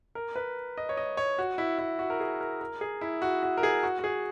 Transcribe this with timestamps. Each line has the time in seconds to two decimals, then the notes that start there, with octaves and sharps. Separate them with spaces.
0.15 A#4
0.36 B4
0.77 D#5
0.89 C#5
0.97 D#5
1.17 C#5
1.39 F#4
1.58 E4
1.78 E4
1.99 F#4
2.10 A#4
2.20 G#4
2.41 A#4
2.61 A#4
2.81 G#4
3.01 E4
3.22 F#4
3.43 F#4
3.58 A#4
3.63 G#4
3.83 F#4
3.99 F#4
4.04 G#4